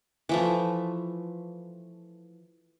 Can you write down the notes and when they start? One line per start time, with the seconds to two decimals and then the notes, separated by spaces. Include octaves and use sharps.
0.29 E3 F3 A3